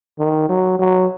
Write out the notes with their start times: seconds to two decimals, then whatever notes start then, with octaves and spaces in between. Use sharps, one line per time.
0.19 D#3
0.49 F#3
0.79 F#3